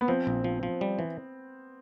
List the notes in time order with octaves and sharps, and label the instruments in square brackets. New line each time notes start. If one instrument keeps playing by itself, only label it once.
[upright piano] B3
[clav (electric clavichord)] F3 [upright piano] C4
[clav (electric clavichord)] A#1
F3
F3
G3
E3